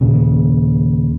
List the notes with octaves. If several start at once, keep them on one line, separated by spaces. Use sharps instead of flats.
D#2 A#2 C#3